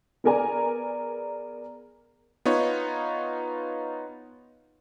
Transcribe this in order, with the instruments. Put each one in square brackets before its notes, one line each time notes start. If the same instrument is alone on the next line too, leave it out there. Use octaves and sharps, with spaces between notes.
[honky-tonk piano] B3 G#4 A#4 D5 G#5 A#5
[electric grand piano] B3 D#4 F4 C#5